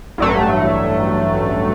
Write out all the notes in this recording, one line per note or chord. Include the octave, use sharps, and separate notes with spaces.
A1 G2 F#3 A3